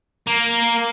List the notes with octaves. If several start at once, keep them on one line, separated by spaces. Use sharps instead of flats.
A#3